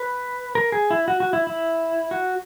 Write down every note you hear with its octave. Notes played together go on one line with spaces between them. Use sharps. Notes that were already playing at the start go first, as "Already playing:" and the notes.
Already playing: B4
A#4
G#4
E4
F#4
F#4
E4
E4
F#4